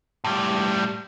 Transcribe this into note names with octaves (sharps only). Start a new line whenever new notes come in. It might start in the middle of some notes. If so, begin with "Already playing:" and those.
A2 G3